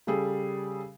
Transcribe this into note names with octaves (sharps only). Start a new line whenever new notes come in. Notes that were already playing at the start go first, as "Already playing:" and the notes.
C#3 G3 G#4 A4